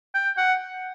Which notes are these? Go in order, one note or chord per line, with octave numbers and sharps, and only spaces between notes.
G5
F#5